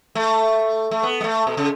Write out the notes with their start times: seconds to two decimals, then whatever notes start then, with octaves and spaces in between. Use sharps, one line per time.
0.15 A3
0.91 A3
1.03 B3
1.21 G#3
1.24 A3
1.47 B2
1.57 C#3